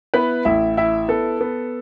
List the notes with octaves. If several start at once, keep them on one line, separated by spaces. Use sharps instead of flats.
B3 E4 B4
A1 E4 E5
E4 E5
B3 A4
B3